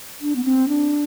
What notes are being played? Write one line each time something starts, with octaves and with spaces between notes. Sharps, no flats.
D4
B3
C4
D4